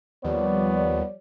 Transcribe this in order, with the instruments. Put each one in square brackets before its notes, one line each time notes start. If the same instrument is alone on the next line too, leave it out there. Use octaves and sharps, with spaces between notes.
[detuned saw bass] D#2 [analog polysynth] F3 G3 [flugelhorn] B3 [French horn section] C#5 D5